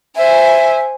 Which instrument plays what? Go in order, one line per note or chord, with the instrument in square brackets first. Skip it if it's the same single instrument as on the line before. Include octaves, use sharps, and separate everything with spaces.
[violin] C5 G#5 [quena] E5